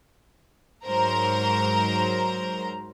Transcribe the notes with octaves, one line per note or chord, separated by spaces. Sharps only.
G#2 F#3 A#4 C5 A#5